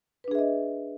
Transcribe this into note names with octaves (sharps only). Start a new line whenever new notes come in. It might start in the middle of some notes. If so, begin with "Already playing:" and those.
D4 G#4 B4 D#5 E5